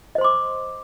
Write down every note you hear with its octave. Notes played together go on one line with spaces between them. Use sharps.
C5 D#5 C6 D6